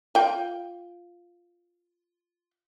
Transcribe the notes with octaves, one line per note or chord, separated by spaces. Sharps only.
F4 G5